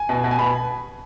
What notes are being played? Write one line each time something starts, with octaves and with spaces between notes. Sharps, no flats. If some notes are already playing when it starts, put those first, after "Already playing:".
Already playing: G#5
B2
B2
G#5
B2 B5